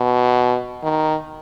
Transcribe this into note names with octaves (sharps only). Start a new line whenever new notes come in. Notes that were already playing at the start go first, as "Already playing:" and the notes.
Already playing: B2
D#3